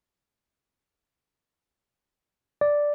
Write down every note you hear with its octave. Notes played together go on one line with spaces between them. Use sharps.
D5